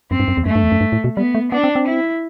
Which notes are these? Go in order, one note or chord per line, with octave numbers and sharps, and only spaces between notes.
F#2 C4
G2
F#2
E2
F#2 A3
G2
E2
F#2
G2
A2
B2
G3 B3
A3
B3 D4
C4
C4
E4